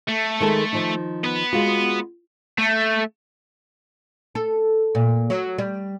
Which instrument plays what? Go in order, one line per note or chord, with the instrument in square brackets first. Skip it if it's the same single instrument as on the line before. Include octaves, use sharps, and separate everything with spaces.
[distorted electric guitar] A3
[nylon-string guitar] D#3 G#3 A4
D#3 F3 D#4
[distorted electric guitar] B3 B4
[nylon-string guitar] G#3 F4 F#4
[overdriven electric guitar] A3
[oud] A4
A#2
F#3
G3